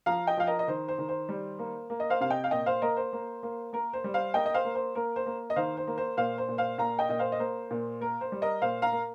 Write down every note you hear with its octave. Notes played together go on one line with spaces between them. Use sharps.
F3 F5 A#5
D#5 G5
F3 F5
A#4 D#5
D#5
D#3 C5
C5
D#3
C5
G3
A#3
A#3
D#5
C5 F5
C3 F5
D#5 G5
F5
A#2 D#5 G5
C5 F5
A#3 A#4 D#5
C5
A#3
A#3
A#3 A#4
C5
G3
C5 F5
A#3 D#5 G5
D#5
C5 F5
A#3
C5
A#3 A#4
C5
A#3
D#5
D#3 C5 F5
C5
A#3
C5
A#2 C5 F5
C5
A#2
C5 F5
A#2 F5 A#5
D#5 G5
A#2 D#5
C5 F5
D#5
A#3 C5
A#2
A#3 A#4
C5
G3
A#4 D#5
A#2 C5 F5
F5 A#5
A#3